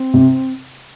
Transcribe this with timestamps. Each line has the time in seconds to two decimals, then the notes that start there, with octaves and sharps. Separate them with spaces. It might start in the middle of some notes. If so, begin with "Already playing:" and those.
Already playing: C4
0.14 C3